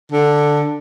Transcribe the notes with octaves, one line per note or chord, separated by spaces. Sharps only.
D3